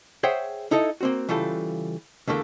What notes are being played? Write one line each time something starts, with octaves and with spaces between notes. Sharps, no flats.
G#4 C5 C#5 E5 F#5 G5
D#4 E4 A4 D#5
A#3 C4 F#4
C#3 E3 G3 F4 A4
E2 D3 A3 A#3